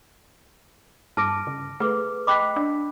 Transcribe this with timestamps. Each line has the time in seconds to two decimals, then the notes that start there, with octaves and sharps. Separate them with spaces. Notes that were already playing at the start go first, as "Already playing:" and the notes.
1.17 G2 A5 D6 F6 A#6 D7
1.47 C#3
1.80 A3 G#4 B4 D6 F6
2.27 D#5 G5 B5 D6 F#6 B6
2.56 D4